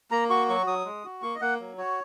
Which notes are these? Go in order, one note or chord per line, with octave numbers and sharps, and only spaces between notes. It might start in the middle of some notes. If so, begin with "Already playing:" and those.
A#3 A#5
F#4 C#6
F#3 C#6
F#3 D#6
G#3
F#4
A#3 C#6
D#5
A#3 F#5
F#3
F#4 C#5